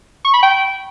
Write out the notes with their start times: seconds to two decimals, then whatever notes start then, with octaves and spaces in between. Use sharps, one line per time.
0.25 C#6
0.34 B5
0.43 G5